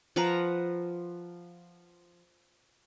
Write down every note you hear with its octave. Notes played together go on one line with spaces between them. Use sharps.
F3 B4 F#5 A#5